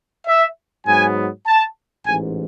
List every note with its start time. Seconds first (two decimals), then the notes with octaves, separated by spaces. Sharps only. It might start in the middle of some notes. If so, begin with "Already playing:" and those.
0.27 E5
0.86 G#2 F#3 B3 G#5
1.46 A5
2.05 A1 G#2 E3 G#5